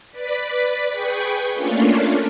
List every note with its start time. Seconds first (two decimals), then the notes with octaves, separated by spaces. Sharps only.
0.11 B4 D5 B6
0.91 G#4 B4 G5 C#6 G6
1.54 A3 A#3 C#4 D4 F4